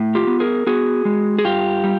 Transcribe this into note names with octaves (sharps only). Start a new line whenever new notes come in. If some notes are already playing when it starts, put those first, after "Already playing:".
Already playing: A2
F4 G4
B3
G#4 A#4
B3 F#4 G#4
G#3
G#4
G2 F4 G4
G3